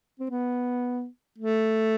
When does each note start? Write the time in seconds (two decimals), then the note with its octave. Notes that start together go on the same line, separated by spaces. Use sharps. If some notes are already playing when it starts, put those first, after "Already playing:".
0.20 C4
0.30 B3
1.38 A3